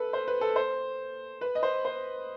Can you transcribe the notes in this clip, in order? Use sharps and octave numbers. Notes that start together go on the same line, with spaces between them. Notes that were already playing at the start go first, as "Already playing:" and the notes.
Already playing: A4 B4
C5
B4
A4
C5
B4
D#5
C5
C5